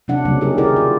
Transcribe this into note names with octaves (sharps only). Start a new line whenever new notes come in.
C3 F#3 D4 F#5
C#3 F#3 G3 A#3
D#4 G4 G#4 A#4
D#3 E4 G4 G#4 A#4 D5
F4